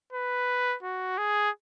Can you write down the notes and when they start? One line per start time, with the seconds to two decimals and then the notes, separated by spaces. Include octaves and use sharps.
0.13 B4
0.83 F#4
1.18 G#4